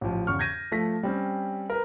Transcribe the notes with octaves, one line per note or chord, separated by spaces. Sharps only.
A1 F3
E2 C#3 C#6 F6
G6 G#6 A#6 D#7
F3 A3 A4 A#6 B6
G3 C4 C#4
A#4 B4